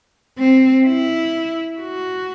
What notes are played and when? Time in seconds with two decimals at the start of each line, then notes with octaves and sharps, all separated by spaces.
0.38 C4
0.85 E4
1.80 F#4